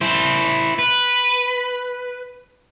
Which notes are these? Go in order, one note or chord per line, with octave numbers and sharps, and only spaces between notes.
E4 C5
B4